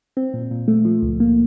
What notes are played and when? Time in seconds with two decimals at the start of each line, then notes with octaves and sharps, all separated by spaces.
0.17 C4
0.33 A#2
0.51 A#2
0.68 A3
0.85 F3
1.03 C#2
1.20 A#3